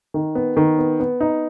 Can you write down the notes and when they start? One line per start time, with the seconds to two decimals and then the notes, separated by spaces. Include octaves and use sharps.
0.14 D#3
0.35 B3
0.57 D#3
0.78 B3
1.00 B3
1.20 D#4